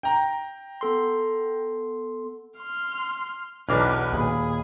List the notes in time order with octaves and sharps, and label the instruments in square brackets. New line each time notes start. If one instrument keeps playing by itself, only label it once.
[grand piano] G5 A#5
[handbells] B3 A4 C6
[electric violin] C6 F6
[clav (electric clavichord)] B1 D4 A#5 [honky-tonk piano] E2 D6 F6 [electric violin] B4
[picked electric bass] D#2 A#2 [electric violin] G#4 [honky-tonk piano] B5